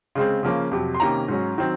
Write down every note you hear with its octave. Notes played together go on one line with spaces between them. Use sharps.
C#3 G#3 C4
C#3 F3 A#3 C#4
F2 C3 F#3
C6
C3 D#3 A#3 C#4 A#5
G#2 F#3 C#4
D#3 F#3 C4